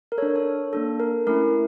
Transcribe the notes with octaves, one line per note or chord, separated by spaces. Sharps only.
A#4
A4 C#5
D4
A4 C#5
A#3 D4 A4
A#4
A3 C#4 E4 A#4